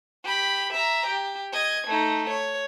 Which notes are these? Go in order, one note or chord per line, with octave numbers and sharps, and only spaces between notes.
G4 B5
E5 A#5
G4
D#5 G#6
A3 D#4
C#5